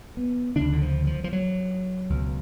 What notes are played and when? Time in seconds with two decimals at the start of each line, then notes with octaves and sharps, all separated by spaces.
0.17 B3
0.55 D2 C#3 D4
0.73 D3
0.82 F3
1.07 F3
1.24 F3
1.33 F#3
2.10 C#2 B2